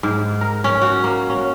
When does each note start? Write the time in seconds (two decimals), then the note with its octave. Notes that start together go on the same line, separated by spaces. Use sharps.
0.03 G#2
0.41 A#4
0.64 C#4
0.82 F#4
1.04 A#3
1.30 C#4